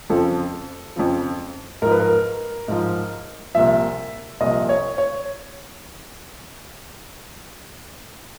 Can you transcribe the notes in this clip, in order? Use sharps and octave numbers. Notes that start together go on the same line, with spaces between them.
F2 C#3 F3 A4
F2 C#3 F3
G#2 F3 A#4
B4
A#4
G#2 F3
C2 A#2 F3 E5
C2 A#2 F3 D#5
C#5
C#5